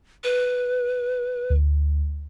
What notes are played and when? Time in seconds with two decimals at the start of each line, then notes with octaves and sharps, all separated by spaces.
0.24 B4
1.50 D2